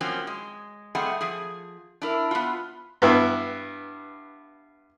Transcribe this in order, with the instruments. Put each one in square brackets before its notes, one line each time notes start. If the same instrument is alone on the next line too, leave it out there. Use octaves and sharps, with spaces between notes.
[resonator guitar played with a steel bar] F3 F#3 A#3 C4 C#4
G#3
G3 A3 C4 G#4 D#5 F#5
F3 G#4
D4 E4 A#4
B3 F4
[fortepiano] G2 B3 E4